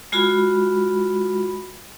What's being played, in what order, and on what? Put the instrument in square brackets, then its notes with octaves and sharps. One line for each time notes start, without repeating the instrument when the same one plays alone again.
[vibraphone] G#3 F4 F#4 B5